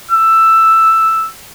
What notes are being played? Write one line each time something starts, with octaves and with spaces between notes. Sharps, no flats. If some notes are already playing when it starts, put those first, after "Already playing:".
E6